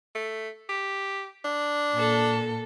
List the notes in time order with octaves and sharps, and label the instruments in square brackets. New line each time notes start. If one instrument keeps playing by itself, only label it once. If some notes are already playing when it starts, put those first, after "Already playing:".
[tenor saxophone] A3
G4
D4
[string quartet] A#2 A4